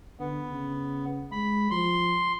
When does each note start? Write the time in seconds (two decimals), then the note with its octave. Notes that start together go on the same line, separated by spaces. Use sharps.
0.20 D3 B3
0.51 C#3
1.32 G#3 B5
1.71 F3 C6